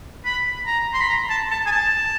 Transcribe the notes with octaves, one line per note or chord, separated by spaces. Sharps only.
B5
A#5
C6
B5
A#5
A5
A5
G#5
A5